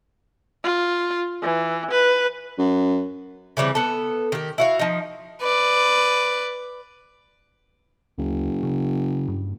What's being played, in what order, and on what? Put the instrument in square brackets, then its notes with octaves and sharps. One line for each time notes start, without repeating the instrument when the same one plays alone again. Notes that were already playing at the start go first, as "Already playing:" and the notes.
[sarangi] F4
E3
B4
[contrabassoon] F#2
[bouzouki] C#3 E3 G3 C4
B3 A4
D#3 G4
E4 F#4 F5
F3 D#4
[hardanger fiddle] B4 D5
[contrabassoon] F#1 [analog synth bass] D2
[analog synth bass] C#3
G2